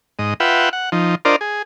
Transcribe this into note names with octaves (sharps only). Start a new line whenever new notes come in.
G#2 D#5
F4 B4 E5 F#5 G5
F#5
F3 D#4
D4 F4 A#4 C5 D5 D#5
G#4